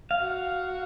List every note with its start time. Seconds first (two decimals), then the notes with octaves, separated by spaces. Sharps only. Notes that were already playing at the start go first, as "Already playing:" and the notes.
0.11 F5
0.20 F#4
0.30 F5